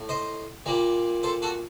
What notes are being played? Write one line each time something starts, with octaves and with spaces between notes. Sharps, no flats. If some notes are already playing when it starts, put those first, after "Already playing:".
Already playing: A2
C5 D#5
A#2 G3 A#3
A4 C5
F#4 A4